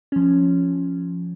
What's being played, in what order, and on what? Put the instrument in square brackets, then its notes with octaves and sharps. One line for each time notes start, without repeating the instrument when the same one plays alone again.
[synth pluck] F3 C#4